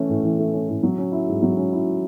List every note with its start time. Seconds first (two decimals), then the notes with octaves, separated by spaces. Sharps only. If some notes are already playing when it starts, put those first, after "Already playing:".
Already playing: E3 A3 C#4
0.09 A2
0.23 E3
0.39 A3
0.53 C#4
0.68 A2
0.83 F#3
0.98 C#4
1.12 E4
1.27 G#2
1.42 F#3
1.57 C#4
1.72 E4